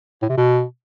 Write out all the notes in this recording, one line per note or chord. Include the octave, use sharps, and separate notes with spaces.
A2
C3
B2